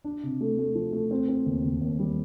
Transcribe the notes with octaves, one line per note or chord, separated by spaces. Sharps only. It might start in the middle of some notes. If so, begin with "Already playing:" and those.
D4
C3
A3
A3
F3
A3
C4
C4
D#2
D#2
D#2
G3